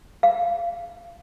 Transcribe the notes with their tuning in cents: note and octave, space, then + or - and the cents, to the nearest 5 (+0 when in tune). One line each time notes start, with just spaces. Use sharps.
F5 -20